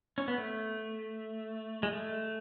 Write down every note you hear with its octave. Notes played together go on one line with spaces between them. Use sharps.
C#4
B3
A3
G#3
A3